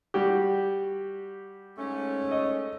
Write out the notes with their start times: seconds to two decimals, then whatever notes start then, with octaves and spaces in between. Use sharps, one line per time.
0.14 G3 F#4 G4
1.77 G#2 A3 C#4
2.31 D#5